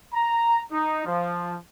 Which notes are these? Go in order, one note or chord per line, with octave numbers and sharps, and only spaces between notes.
A#5
D#4
F3